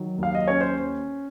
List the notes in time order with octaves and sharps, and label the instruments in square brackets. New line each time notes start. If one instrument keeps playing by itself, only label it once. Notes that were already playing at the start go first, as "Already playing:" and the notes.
Already playing: [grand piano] D#3 F#3
D#2 F5
D#5
C#4 C#5
C5